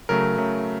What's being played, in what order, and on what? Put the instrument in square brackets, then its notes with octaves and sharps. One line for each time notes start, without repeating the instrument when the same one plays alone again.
[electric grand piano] C#3 F#3 A3 A#4
C#3 F#3 A3